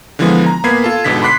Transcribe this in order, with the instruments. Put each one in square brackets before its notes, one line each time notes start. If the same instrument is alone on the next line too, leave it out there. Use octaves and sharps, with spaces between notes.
[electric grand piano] D3 E3 F3 G#3 B3
A#5
A#2 A#3 B3 B5 G#6 C7
F4 A4
G1 G#2 B2 D3 B6
B5 C6 D6 F#6 B6 C7